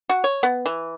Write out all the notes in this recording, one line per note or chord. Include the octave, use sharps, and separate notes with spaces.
F#4
C#5
B3
E3